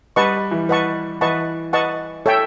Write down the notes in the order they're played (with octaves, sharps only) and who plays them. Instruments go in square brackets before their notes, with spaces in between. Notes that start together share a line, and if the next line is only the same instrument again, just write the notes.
[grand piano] G3 [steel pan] B4 D#5 F#5 A5 C#6
[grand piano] E3
[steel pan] B4 D#5 F#5 A5 C#6
[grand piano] E3 [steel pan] B4 D#5 F#5 A5 C#6
[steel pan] B4 D#5 F#5 A5 C#6
A4 C#5 E5 G5